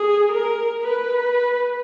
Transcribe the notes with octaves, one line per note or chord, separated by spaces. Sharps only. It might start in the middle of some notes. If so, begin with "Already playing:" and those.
Already playing: G#4
A#4
B4